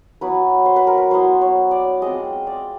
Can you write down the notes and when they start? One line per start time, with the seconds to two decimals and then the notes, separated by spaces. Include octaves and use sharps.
0.21 F#3 B3 E4 B4
0.66 C5
0.76 B4
0.87 A#4
0.97 B4
1.11 F#3 B3 E4 C5
1.41 C#5
1.71 D5
2.02 G#3 C4 F4 D#5
2.47 D5